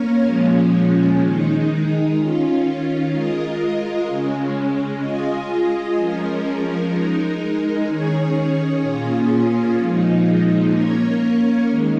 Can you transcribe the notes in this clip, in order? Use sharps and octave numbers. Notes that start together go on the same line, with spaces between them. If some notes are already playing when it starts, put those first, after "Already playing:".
Already playing: A#3 C#4 A#4 C#5
A#2 F3 G#3 C#4
D#3 G#3 D#4
D#3 C#4 F4
G#3 F4 A#4 D#5
C#3 G#3 C#4
G#3 F4 G#4 D#5
F3 G#3 C#4 A#4
G#3 D#4 A#4
D#3 C#4 G#4 C#5
A#2 A#3 C#4 F4 G#4
A#2 F3 G#3 D#4
A#3 C#4 A#4 C#5
D#3 G#3